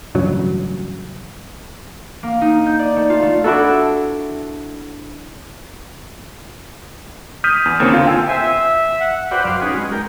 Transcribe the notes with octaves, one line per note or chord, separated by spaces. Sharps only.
A1 G2 C#3 F#3
A#3
D#4
G6
D5
A3
F4
A3
D4 E4 F#4 A4
D#6 F6 G6 B6 D#7
E2
D#2 C#3 A#3 C4 C#7
D3 F4
F5 G5 G#5 E6
C5 E5 G#5
E5
F#5
F#4 B4 C5 D5 F#5 G5
F#2 F5 C6 D6
C#4 D#4 F#4 G#4 B4
G#3
A#4 G5